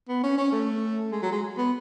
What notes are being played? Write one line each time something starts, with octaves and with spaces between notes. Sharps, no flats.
B3
C#4
C#4
A3
G#3
F#3
G#3
B3